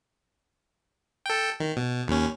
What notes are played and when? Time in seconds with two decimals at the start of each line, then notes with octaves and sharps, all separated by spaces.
1.26 A4 G5
1.60 D#3
1.77 B2
2.08 D#2 C#4